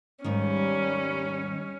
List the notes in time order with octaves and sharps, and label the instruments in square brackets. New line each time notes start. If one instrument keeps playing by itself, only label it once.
[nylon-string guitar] D#2 G#2 D#3 [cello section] G3 [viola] C#4